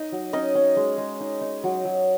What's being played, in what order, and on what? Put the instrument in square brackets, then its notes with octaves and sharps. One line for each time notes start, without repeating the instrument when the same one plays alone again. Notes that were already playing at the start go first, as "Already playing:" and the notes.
Already playing: [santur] D#4 D#5
F#3
C#4 D#4 D#5
C#4
G#3
G#3
D#4
D#4
F#3
F#3